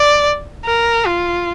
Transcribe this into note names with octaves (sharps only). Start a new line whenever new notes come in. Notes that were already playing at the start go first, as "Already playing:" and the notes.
Already playing: D5
A#4
F4